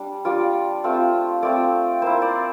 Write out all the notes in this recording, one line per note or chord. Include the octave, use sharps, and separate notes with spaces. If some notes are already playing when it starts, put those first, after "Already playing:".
Already playing: G3 D4
G3 D4 F4 D5
A3 C4 F4
A3 C4 F4 D5
A#3 E4 C5
D5